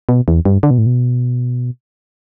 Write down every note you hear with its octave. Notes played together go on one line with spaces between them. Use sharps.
B2
E2
G2
D3
B2
A2
B2